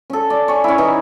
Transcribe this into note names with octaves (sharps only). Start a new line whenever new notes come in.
C#4 A4
D5
C#5 G#5
C#4 E4
E3 D#4